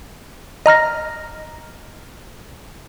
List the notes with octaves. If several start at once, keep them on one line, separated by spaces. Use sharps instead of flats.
D#5 A#5 F6 A#6